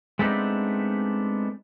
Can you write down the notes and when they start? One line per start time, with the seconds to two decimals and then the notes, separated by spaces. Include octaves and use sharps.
0.19 G#3 A3 B3 C4 D4 D#4